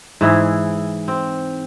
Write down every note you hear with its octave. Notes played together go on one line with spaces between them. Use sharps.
G#2 E3 E4 G#4
C4